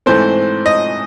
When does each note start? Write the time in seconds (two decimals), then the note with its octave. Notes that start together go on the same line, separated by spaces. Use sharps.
0.06 G#2 E3 A3 C4 C5
0.66 D#5